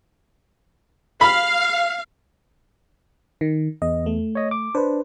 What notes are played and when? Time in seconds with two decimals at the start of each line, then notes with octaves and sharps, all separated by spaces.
1.21 F5 B5
3.41 D#3
3.82 E2 D#5
4.06 A3
4.35 C#5 D#5
4.51 D6
4.75 D4 B4 C5